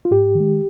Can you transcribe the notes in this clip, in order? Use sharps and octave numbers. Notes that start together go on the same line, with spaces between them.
F4
G#2 G4
D#3
G#3